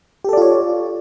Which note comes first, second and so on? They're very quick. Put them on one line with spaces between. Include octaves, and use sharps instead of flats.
G4 A4 D5 F4 C#5